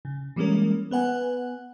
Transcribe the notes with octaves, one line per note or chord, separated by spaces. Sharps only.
C#3
E3 G3 G#3 A#3 C#4 A#4
B3 B4 F#5 G#5